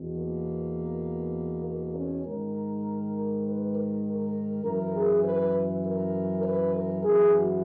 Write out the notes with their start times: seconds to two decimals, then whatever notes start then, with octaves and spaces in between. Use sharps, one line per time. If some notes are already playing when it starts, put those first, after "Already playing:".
Already playing: E2 B2
0.16 A#3
1.65 A#3
1.95 C#4
2.25 G#2 D#3 A#4
3.45 B4
3.75 A#4
4.04 A#4
4.64 F#2 E3 A#4
4.94 G#4
5.24 B4
5.84 A#4
6.43 B4
6.74 A#4
7.03 F#2 E3 G#4
7.34 F#4